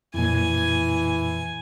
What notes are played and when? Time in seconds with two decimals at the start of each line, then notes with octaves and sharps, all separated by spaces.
0.14 F2 A#2 E3 G#5